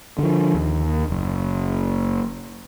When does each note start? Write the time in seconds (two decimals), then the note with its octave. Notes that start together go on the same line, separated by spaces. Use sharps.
0.19 D3 F3
0.54 D#2
1.10 F#1